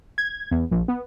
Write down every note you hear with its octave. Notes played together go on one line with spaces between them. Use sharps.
G#6
E2
A#1
B3